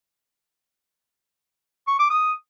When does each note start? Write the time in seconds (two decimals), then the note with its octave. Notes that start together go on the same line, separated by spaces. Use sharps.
1.88 C#6
1.99 D6
2.10 D#6